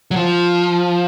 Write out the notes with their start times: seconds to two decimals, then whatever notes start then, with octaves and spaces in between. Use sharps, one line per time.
0.11 F#3
0.16 F3